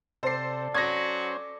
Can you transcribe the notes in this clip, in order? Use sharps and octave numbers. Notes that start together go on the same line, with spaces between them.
C3 A4 C5 D5 C7
F#3 C#4 F#4 C5 D5 G#6 A#6